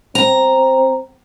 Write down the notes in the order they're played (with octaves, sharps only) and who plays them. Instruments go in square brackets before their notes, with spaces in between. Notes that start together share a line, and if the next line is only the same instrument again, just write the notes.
[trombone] C4 [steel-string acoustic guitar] A#5